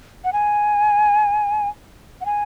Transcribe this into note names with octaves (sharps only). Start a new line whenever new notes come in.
F#5
G#5
F#5
G#5